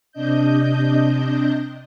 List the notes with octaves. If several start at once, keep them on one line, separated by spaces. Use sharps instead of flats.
C3 D4 D#5 G6